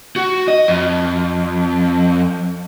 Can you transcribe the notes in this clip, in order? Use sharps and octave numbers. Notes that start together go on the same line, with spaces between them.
F#4
D#5
F2